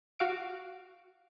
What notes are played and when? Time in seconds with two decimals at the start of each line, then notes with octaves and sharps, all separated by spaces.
0.19 F#4 F5 D7